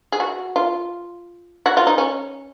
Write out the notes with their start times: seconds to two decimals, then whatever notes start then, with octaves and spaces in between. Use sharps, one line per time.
0.12 G#4
0.20 F#4
0.56 F4
1.66 F#4
1.77 F4
1.87 D#4
1.98 C#4